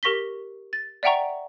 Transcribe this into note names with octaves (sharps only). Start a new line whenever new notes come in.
G4 A#4 C#6 A#6 B6 G7
A6
D5 E5 F#5 G5 A#5 C#6